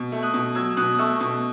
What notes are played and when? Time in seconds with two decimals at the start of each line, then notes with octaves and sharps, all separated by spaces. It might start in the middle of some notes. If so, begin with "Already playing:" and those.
Already playing: B2
0.12 A3
0.23 D#6 F#6
0.34 B2
0.55 F#3 E6 G#6
0.77 B2 D#6 F#6
0.94 D#6
0.98 A3 C#6 E6
1.20 B2